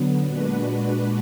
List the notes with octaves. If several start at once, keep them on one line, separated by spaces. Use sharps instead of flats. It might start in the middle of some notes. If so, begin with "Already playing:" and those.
Already playing: D3 F#3 B3
A#2 G#3 D4 F#4 B4